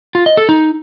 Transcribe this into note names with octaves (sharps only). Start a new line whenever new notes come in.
F4
D#5
A4
D#4